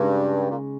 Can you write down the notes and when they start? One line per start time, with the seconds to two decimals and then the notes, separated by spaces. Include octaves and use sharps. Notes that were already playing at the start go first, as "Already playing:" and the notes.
Already playing: G2 C#3 G#3 D#4
0.50 A#2